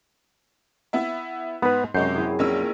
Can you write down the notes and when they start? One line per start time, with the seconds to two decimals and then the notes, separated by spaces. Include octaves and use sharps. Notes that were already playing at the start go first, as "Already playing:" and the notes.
0.93 B3 E4 E5
1.62 G#2 B3 B4 E7
1.94 F#2 C3 G#3 C#6 G6 C7
2.15 C4 E4 G#4
2.39 A#1 A#3 C#4 E6